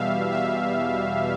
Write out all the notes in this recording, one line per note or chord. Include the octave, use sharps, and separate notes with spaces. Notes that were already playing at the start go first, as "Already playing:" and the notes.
Already playing: E2 B2 G3 E5 F5
E5